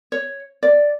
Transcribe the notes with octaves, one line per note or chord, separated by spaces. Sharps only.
C#5
D5